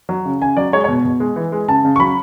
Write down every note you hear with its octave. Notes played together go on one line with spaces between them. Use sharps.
F#3
C#3
C#3 G#5
F#3 D5
G#3 C#5
C#5
B2
B2
G#3
E3
G#3
C#3 A5
C#3
C#6
F#3 B5